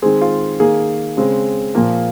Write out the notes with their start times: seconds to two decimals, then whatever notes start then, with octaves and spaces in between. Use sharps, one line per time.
0.02 D#3 G#3 C4 G#4
0.22 F4
0.60 D#3 A#3 G#4
1.17 C#3 G#3 C4
1.75 A#2 F3 A#3